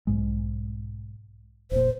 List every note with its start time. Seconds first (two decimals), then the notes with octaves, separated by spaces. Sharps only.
0.07 B1 G#2 G#3
1.71 F1 A#2 C5